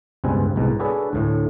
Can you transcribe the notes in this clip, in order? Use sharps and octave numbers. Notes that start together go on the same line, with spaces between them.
C#2 G2 B2 C4 B4 G#5
C2 G#2 B2
D4 F#4 G#4 A4 B4 C#5
D2 A2 A3